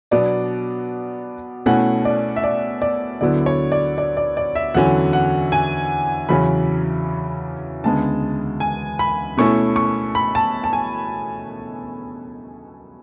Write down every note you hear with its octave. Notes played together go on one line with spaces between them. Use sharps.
B2 F#3 B3 D4 D5
B2 A3 C#4 E4 F#5
D5
E5
D5
D5
D2 D3 F#3 B3 E4 D5
C#5
D5
D5
D5
D5
E5
E2 D3 F#3 C#4 E4 F#5
F#5
G#5
E2 C#3 F#3 C#4 B5
D2 C#3 G#3 B3 A5
G#5
B5
B2 A3 C#4 E4 C#6
C#6
B5
A5
A5
G#5